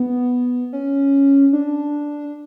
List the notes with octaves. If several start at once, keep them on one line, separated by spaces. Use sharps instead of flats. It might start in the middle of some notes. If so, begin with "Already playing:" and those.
Already playing: B3
C#4
D4